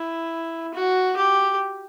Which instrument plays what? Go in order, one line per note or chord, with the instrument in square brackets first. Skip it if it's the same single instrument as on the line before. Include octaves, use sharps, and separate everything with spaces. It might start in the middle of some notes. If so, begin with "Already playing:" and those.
Already playing: [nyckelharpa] E4
F#4
G4